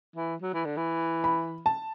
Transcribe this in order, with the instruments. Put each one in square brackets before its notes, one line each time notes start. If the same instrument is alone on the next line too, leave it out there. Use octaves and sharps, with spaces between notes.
[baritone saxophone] E3
F#3
E3
D3
E3
[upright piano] B5
A5